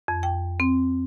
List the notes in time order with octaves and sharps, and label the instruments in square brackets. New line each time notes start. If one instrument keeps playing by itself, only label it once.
[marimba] F2
G5
C4